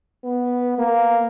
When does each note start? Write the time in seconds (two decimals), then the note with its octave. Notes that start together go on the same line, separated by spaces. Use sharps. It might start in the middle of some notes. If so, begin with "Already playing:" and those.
0.24 B3
0.78 A#3